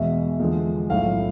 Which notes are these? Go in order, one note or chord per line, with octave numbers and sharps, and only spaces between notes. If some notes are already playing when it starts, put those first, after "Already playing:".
Already playing: E2 B2 G#3 E5
E2 D3 F3 G#3
B1 A2 F3 F5